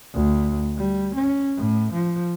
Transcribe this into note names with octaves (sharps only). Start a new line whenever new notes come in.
D2
G3
C#4
A2
F3